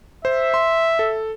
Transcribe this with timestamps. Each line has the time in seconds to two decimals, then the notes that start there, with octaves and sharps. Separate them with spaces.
0.25 C5 E5
0.54 C6
0.99 A4